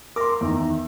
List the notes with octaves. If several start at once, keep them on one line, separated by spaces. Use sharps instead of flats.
A#4 A#5 C6 D6
E2 D#3